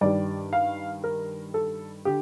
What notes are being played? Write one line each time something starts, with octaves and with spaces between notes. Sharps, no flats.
G2 D#3 G3 D5
F5
A#4
A4
D3 G4